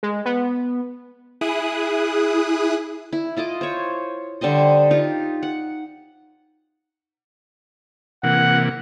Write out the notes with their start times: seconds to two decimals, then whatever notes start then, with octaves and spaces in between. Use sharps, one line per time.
0.03 G#3
0.25 B3
1.41 E4 G#4 D#6 F#6
3.13 E4
3.37 E4 F4 D#5 D6
3.61 C5 C#5
4.41 D3 G3 C5 D#5
4.91 D#4 F4 G4
5.43 F#5
8.24 C3 E3 A#3 F#5